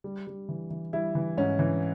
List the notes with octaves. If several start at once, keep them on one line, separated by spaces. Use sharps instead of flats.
G3
G3
E3
E3
G3 E4
E3
G#2 C#4
E3